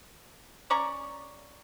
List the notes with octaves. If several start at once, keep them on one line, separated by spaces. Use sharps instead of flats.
C#4 D5 A#5 C#6